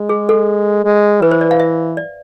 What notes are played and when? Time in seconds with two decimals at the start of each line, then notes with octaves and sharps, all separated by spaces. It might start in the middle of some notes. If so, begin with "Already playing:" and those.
Already playing: G#3
0.09 G#4
0.29 A4
0.85 G#3
1.22 E3 B4
1.31 C5
1.41 D5
1.51 F5
1.60 E5
1.97 D5